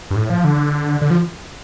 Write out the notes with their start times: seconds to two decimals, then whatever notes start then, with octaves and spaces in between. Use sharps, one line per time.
0.11 G2
0.16 A2
0.30 F3
0.44 D3
1.02 D3
1.10 F3